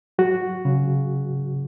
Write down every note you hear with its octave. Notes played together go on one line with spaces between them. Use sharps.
F#3 F#4
C#3